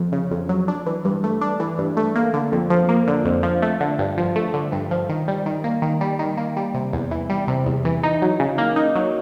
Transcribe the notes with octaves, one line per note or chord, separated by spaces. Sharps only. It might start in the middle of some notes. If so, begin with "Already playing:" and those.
Already playing: F2
C#3
F2
F#3
D4
E3
G2
A3
D4
E3
G2
A3
A#3
D3
F2
F3
A#3
D3
F2
F3
A3
D3
G2
F3
A3
D3
G2
F3
D#3
G3
D#3
A#3
D#3
G3
D#3
A#3
G3
C3
E2
E3
G3
C3
E2
E3
D#4
F#3
C#3
A#3
D#4
F#3